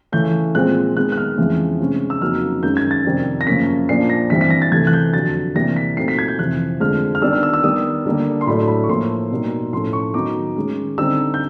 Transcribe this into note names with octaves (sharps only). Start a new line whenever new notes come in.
C#3 E3 A3 C#4 G6
A#2 F3 G#3 C4 F#6
D#3 G#3 B3 F#6
F#6
F6
F2 C#3 E3 G#3 B3
C3 D#3 G#3 C#4
E6
F2 C#3 F#3 A#3 D#4 F6
F#2 D#3 G#3 C#4 G6
G#6
A6
F2 C3 D#3 G3 C4
A#6
F#2 C#3 F3 A#3 C#4 B6
A#2 F3 A#3 D4 C7
A#6
G2 E3 G3 C4 B6
B6
A#6
A6
E2 C3 E3 A3 C4 G#6
F#6
G6
F2 D3 F#3 A6
C3 E3 G3 A#3 A#6
B6
A#2 F#3 A3 C4 D#4 C7
B6
G#6
G6
F2 C3 E3 F#6
F2 D3 F3 G#3 F6
F6
D#3 G3 B3 D4 E6
F6
E6
E6
D#3 G3 B3 D#6
D3 G3 A#3 D4
C6
A2 F#3 A3 D4 B5
B5
C#6
A2 F3 A#3 C6
B2 G3 A#3 D#4
A2 F3 A3 C#4 C6
C#6
D#3 F#3 B3 D#4 D6
D#3 G#3 C#4
D3 G3 C4 D#4 E6
G6